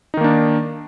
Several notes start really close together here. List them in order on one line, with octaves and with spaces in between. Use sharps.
D#4 D#3 A#3 D4